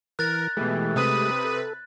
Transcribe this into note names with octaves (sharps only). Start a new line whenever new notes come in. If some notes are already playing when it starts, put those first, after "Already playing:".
E3 A#4 F#6 A6
B2 E3 G#3 A3 G4
C3 B4 D#6
A4